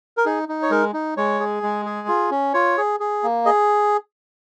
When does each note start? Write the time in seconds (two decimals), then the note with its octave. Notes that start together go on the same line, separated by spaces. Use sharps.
0.17 A#4
0.25 D#4 G#4
0.49 D#4
0.62 C#5
0.71 G#3 A#4
0.93 D#4
1.17 G#3 C#5
1.40 G#4
1.63 G#3
1.85 G#4
2.08 F4
2.31 C#4
2.54 F4 C#5
2.78 G#4
3.00 G#4
3.23 A#3
3.45 G#4 D#5